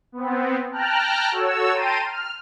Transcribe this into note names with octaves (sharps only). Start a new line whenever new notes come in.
B3 C4
G5 A5 A#5 F6 F#6
F#4 A4 C#5 E6
G5 A5 A#5 C6 D#7
F6